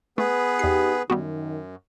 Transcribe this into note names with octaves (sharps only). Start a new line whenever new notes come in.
A3 B3 G#4 B4
E2 D#4 G4 C7
F#2 D#3 G3 B3 F#4